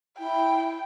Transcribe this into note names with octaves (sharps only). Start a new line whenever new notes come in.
E4 G5